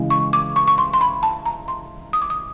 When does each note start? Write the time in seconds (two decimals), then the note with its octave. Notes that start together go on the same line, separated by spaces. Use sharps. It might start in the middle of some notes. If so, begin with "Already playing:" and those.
Already playing: C#3 E3 G#3
0.10 C#6
0.33 D6
0.56 C#6
0.68 C#6
0.78 C6
0.94 C6
1.01 B5
1.23 A5
1.46 A#5
1.68 C6
2.13 D#6
2.22 D6
2.30 D#6